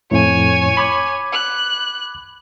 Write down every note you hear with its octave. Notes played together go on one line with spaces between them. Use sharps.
F2 A2 C#5 G#5
B5 D6 G#6
F#6